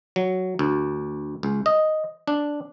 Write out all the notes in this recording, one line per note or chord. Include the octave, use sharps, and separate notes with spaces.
F#3
D2
C#2
D#5
D4